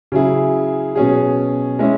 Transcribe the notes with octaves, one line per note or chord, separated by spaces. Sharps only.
C#3 F#3 E4 G#4
B2 F#3 C#4 G#4
G#3 C#4 E4